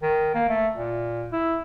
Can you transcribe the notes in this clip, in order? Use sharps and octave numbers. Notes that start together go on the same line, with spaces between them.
D#3
A#3
A3
A#2
E4